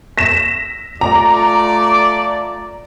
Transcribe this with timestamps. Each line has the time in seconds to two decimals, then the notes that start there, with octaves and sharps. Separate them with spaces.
0.18 A#6 B6 E7
1.01 A3 F4 D5 A#5